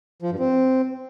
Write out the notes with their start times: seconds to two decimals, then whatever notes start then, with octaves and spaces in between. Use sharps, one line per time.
0.22 F3
0.31 G2
0.39 C4